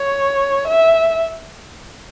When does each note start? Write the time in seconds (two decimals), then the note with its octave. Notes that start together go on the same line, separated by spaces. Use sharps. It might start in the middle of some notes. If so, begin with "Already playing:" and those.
Already playing: C#5
0.67 E5